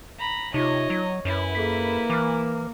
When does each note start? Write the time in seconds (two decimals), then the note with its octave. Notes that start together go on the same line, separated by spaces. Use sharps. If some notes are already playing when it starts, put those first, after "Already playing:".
0.18 A#5 B5
0.54 C3 D#4 F4 C#5 D#5
0.90 F#3
1.25 F#2 E4 B4 C#5
1.55 A#3 G#4 A4 B6
2.10 E3 D6 F6